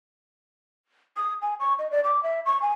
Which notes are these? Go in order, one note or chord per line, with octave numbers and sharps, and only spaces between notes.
D#6
G#5
C#6
D#5
D5
D6
E5
C#6
G#5